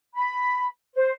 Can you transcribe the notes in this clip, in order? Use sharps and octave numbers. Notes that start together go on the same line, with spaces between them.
B5
C5